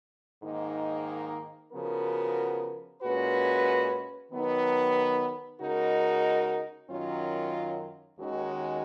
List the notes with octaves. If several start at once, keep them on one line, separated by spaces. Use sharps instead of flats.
G#2 D#3 A#3 D#4
C#3 F3 B3 F#4 A#4
A#2 G#3 C#4 F#4 B4
D#3 F#3 B3 D#4
C#3 G#3 D#4 F#4 A#4
F#2 D#3 F#3 C#4 F4
D#2 D#3 G#3 C#4 F#4